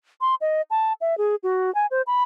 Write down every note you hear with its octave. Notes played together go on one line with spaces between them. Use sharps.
C6
D#5
A5
E5
G#4
F#4
G#5
C5
B5